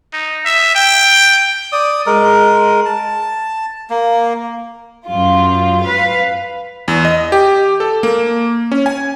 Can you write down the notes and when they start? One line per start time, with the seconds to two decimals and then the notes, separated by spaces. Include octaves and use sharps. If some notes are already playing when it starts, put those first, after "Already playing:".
0.13 D#4
0.45 E5
0.75 G5
1.72 D5 D#6
2.06 G#3 A#4
2.85 A5
3.90 A#3
5.06 F#2 F4
5.83 B4 F5
6.88 E2
7.05 D#5
7.32 G4
7.80 A4
8.03 A#3
8.72 C#4
8.86 G#5